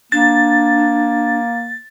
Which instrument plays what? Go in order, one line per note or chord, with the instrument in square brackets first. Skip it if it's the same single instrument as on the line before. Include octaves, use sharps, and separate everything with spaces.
[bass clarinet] A#3 [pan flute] D4 [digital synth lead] A6